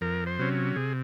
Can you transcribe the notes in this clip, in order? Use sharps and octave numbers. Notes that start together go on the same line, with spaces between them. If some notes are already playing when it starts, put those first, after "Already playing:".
F2 A#4
C5
C3 F#3 C#4
C3 G#4